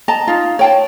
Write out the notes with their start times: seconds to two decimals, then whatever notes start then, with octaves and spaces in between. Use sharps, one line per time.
0.08 D#5 A5 A#5
0.27 D#4 F4
0.59 C#5 G5 A5